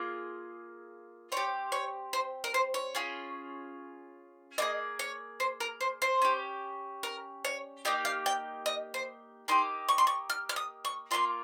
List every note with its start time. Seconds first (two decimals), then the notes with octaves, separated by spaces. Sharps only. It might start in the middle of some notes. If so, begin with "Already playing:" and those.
Already playing: A#3 F4 G#4
1.32 C4 G4 C#5
1.72 C#5
2.13 C5
2.44 A#4
2.54 C5
2.74 C#5
2.95 C#4 F4 G#4
4.58 A#3 F4 G#4 D#5
4.99 C#5
5.40 C5
5.60 A#4
5.81 C5
6.02 C5
6.22 C#4 G4
7.03 A#4
7.45 C#5
7.85 A#3 D#4 G4 D#5
8.05 F5
8.26 G5
8.66 D#5
8.94 C5
9.48 A#3 D#4 G4 C6
9.88 C#6
9.98 C6
10.07 C#6
10.30 F6
10.49 F6
10.56 D#6
10.85 C#6
11.11 A#3 C#4 F4 C6